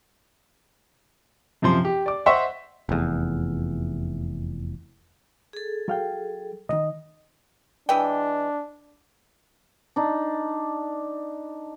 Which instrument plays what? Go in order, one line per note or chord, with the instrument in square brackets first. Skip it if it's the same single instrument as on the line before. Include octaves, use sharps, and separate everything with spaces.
[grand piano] F#2 C3 F3 C6
G4
D5 D6
C5 D#5 E5 F#5 C6 C#6
[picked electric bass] F1 E2
[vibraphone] G#4 A4
[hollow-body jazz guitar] F#3 F5 G5
[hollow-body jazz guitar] B1 D#3 [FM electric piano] D#5
[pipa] E3 G#3 G5 [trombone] D4
[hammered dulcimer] D4 D#4